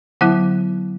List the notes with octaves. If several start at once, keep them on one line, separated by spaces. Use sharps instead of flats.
D3 F#3 B3 E4 F#5